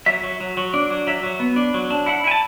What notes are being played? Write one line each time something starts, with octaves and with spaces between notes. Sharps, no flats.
F#3 E5
F#3
F#3
F#3
D4
F#3
F#3 E5
F#3
B3
D4
F#3
D4
E4 F#5
E4 G#5
A5